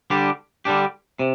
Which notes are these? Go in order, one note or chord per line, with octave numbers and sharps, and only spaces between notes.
D3 G3 D4 G4
D3 G3 D4 G4
C3